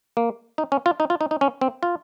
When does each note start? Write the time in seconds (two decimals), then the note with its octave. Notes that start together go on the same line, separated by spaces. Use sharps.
0.17 A#3
0.58 D#4
0.72 C#4
0.86 F4
1.00 D#4
1.10 F4
1.21 D#4
1.31 D#4
1.41 C#4
1.61 C4
1.83 F4